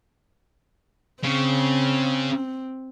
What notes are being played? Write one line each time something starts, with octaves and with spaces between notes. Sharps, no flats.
C#3 C4